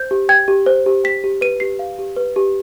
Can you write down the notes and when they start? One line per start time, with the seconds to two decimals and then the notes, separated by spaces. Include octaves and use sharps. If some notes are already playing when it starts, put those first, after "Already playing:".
Already playing: C5 G6
0.11 G4
0.29 G5 G#6
0.48 G4
0.66 C5
0.86 G4
1.04 G5 B6
1.24 G4
1.41 B4 D#7
1.60 G4 C7
1.79 F5
1.99 G4
2.16 B4
2.36 G4